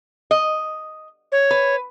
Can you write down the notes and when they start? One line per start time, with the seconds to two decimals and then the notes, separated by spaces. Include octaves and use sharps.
0.31 D#5
1.32 C#5
1.51 B4